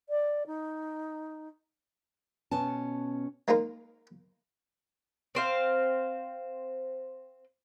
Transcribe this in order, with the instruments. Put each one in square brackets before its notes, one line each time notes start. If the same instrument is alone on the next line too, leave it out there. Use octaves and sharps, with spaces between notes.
[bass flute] D5
D#4
[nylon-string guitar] B2 B3 C#4 A5
[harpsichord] G#3 A#3 D#4 F4 A#4
[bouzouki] C4 C5 F5